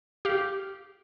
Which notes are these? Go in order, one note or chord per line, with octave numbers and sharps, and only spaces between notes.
G4 F5